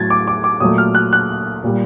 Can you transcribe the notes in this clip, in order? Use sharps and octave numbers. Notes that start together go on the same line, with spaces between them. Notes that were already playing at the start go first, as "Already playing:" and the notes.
Already playing: A2 F#3 A3 G#6 A6
D6
D6
D6
A#2 F#3 A3 D#6
F6
F#6
F#6
A#2 G3